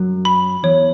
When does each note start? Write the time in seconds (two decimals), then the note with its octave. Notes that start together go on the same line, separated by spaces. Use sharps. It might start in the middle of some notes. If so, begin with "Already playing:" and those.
Already playing: F#2 F#3
0.25 B5
0.63 E2 E3 C#5